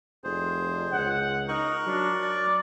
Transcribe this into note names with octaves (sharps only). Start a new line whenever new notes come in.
F1 G#4 C5
C#2 F#5
D#4 A#4 C#6 F#6
F#3 D4
D5